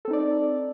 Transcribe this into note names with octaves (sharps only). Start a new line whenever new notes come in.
C4 D#4 A4 D5